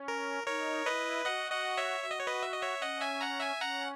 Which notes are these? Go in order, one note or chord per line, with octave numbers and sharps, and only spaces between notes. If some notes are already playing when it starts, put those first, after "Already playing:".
Already playing: C#4
A#4
D#4 A#4 C#5
E4 B4 D#5
F#4 D#5 F#5
D#5 F#5
C#5 E5
F#4 E5
D#5
C#5
B4 D#5
E5
D#5
C#5 E5
C#4 D#5 F#5
E5 G#5
F#5 A#5
E5 G#5
C#4 F#5 A#5